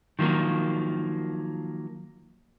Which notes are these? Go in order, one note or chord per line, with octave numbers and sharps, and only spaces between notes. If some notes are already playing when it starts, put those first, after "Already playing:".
D#3 F3 F#3 A#3